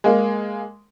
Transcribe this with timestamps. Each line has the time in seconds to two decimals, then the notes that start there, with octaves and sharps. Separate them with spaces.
0.04 G#3 A#3